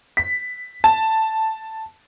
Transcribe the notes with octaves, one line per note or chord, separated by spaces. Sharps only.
B6
A5